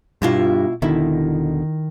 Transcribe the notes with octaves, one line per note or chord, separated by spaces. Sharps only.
G2 B2 E4 F4
E1 B2 D3 D#3 E4